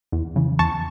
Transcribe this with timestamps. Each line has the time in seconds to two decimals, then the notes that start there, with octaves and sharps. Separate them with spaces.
0.12 E2
0.36 C#3 E3
0.59 E2 A5 C#6